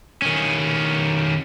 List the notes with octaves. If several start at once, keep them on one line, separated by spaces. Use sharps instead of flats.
D#3 C#4